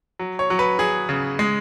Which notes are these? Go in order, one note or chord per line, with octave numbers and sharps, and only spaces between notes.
F#3
C#5
F#3
B4
F#3 G#4
C#3
G#3